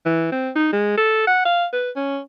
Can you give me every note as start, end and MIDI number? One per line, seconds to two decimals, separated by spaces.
0.06 0.28 52
0.32 0.50 60
0.55 0.70 63
0.73 0.96 56
0.97 1.22 69
1.27 1.42 78
1.45 1.66 77
1.73 1.90 71
1.96 2.19 61